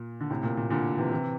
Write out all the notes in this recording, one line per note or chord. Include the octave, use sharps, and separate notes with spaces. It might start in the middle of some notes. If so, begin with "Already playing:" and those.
Already playing: A#2
D3
A2 C3
A#2
A#2
A#2 D3
C3 E3
C3 E3